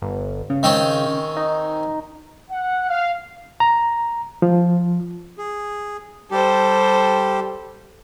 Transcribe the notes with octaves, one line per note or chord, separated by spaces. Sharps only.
G1
C#3
D#3 C4 C#4
D#4
F#5
F5
A#5
F3
G#4
G3 G4 A4 C5